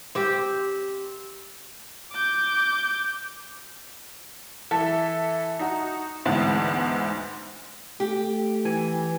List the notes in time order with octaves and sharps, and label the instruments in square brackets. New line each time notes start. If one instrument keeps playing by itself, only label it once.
[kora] C4 G4
[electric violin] D6 G6
[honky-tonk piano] E3 A4 E5
D#4 F#4
D2 G#2 E3 G#3 B3 C4
[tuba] A3 [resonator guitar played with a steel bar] G4
[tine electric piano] E3 G#5